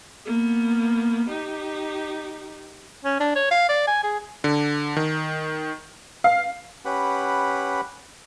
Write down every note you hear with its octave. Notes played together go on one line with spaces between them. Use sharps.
A#3 B3
D#4 G4
C#4
D4
C#5
F5
D5
G#5
G#4
D3
D#3
F5
C#4 G4 B4 F#5 B5